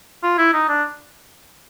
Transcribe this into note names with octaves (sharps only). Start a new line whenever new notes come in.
F4
E4
D#4
D4